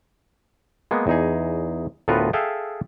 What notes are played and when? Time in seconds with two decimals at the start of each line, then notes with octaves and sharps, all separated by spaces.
0.91 G#3 A#3 B3
1.07 E2 D#4 G#4
2.08 D2 A2 B3 F4 A#4 B4
2.33 G#4 A4 E5 F5 G5